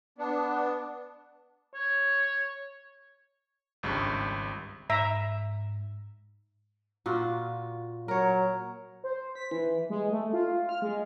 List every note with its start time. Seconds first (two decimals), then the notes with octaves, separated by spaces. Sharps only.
0.18 B3 D4
1.74 C#5
3.83 G#1 C#2 G2
4.90 G#2 E5 A#5
7.06 A#2 F4 F#4
8.08 F#3 A#4 C#5
9.04 C5
9.35 B6
9.51 E3
9.90 G#3
10.12 A3
10.33 F4
10.69 F6
10.82 G#3